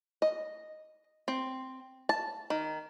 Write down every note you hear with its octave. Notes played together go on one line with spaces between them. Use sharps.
D#5
C4
A5
D#3